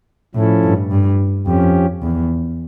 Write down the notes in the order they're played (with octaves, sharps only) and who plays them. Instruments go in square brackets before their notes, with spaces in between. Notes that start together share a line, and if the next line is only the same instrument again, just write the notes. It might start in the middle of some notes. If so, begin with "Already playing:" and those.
[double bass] A2 [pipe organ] F3 C#4 E4 A4
[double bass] G2
G2
[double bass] F2 [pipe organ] F3 C#4 G4
[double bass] E2